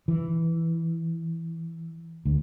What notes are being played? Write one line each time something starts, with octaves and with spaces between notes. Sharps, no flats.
E3
D2